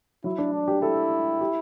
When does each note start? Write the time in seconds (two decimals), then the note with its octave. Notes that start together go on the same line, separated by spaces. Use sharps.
0.24 F#3 E4
0.38 D4
0.53 D4
0.68 G4
0.82 E4 A4
1.41 G4